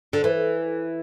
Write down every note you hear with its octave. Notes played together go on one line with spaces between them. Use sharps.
D3
E3